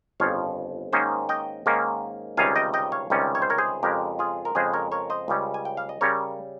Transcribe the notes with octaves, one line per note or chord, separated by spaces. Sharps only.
G1 F2 C#3 F3 C#5 F5
G#2 D#3 A#3 C#4 C5 D#5
D#5 G5
G#2 D#3 A#3 C#4
C#2 C3 D#3 G3 C#4 F5 G#5
D#5 G5
D#5 G5
C#5 F5
C#2 C3 D#3 G3 C#4
C#5
C5
A#4 C#5
G#4 C5
F2 C#3 G#3 G4 A#4
F4 G#4
A#4
F2 C#3 G#3 G#4 C5
A#4 C#5
A#4 C#5
C5 D#5
C#2 C#3 G3 C#4
G#5
G5
F5
D#5
C#3 G3 C#4 A#4 C#5